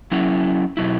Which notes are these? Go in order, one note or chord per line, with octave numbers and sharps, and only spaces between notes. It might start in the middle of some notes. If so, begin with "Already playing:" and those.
F#3 C#4 E4
B2 F#3 E4